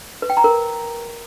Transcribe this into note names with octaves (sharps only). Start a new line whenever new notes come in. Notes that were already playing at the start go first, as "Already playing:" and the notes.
B4
G5
A#5
A#4